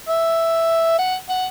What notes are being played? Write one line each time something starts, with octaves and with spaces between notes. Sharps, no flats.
E5
F#5
F#5